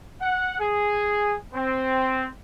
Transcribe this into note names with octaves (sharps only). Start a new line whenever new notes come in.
F#5
G#4
C4